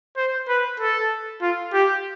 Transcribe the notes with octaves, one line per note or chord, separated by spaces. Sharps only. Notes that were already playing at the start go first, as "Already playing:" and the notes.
C5
B4
A4
F4
G4